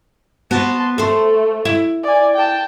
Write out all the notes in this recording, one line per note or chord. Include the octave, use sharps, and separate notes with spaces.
B3 F#4 A5 C6
A3 A4 C5
E4
D5 G#5
G5 A5